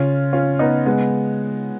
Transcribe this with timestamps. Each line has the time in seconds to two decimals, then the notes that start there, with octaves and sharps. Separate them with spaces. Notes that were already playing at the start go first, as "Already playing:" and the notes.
Already playing: C#3 C#4 F4
0.33 C#4 F4
0.59 B3 D#4
0.86 G#3 B3